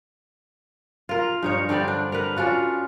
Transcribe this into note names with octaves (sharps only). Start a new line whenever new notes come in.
F4 A#4
G2 D#4 C#5
D3 G3 C4 D5
D4
A#4 B4
C#4 D4 F4 F#4